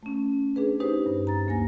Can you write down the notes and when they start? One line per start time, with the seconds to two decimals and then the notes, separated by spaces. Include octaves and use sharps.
0.03 A3 C#4
0.56 D4 G#4 B4
0.80 D#4 G4 B4 C5
1.06 G2
1.27 A#5 A6
1.47 D2 A#3 G#5 A#6